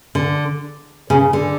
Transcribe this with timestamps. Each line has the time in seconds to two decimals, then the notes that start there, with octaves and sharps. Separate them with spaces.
0.15 D3
1.10 C#3
1.33 D3